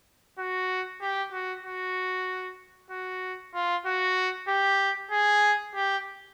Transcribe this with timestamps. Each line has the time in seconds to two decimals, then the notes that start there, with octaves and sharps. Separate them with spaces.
0.39 F#4
1.01 G4
1.32 F#4
1.64 F#4
2.90 F#4
3.54 F4
3.86 F#4
4.48 G4
5.11 G#4
5.75 G4